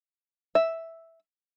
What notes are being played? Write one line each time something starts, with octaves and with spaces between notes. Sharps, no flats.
E5